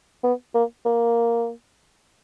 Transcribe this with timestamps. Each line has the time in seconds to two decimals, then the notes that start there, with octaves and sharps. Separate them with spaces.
0.24 B3
0.54 A#3
0.86 A#3